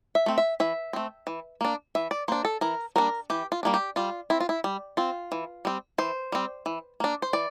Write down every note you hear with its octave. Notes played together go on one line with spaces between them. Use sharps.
E5
A3 C4
E5
E3 E5
A3 C4
E3
A#3 D4
E3 E5
D5
A#3 D4 C5
A4
E3 A#4
G3 A#3 D4 A#4
E3 G4
F4
G3 A#3 D4
G4
G3 F4
C4 E4
F4
E4
G3
C4 F4
E3
G3 C4
E3 C5
G3 C4
E3
A#3 D4
C5
E3 D5